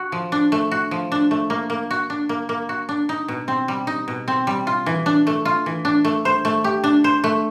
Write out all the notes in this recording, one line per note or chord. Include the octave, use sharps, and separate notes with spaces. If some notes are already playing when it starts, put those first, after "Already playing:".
Already playing: F#4
F3
D4
A3
F#4
F3
D4
A3
A#3
A#3
F#4
D4
A#3
A#3
F#4
D4
D#4
B2
C4
G3
D#4
B2
C4
G3
F4
E3
D4
A3
F4
E3
D4
A3
C5
A3
G4
D4
C5
A3